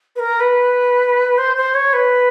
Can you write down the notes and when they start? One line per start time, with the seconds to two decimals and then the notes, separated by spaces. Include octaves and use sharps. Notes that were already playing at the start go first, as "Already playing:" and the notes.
0.16 B4
0.19 A#4
0.40 B4
1.38 C5
1.56 C5
1.74 C#5
1.93 B4